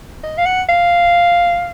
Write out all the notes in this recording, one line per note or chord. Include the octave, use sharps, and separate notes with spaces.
D#5
F5
F#5
F5